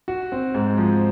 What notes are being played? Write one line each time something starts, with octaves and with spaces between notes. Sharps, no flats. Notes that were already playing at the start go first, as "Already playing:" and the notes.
F#4
C4
G#2
F3